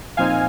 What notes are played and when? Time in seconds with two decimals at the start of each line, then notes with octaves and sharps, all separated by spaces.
0.17 A#2 F3 C4 D#4 F5 G#5